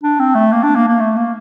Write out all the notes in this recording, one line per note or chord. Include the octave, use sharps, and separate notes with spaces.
D4
C4
A3
A#3
D4
A#3
A#3
A3
A#3